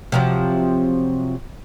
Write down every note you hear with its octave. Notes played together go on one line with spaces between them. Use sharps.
C3 F3 F#3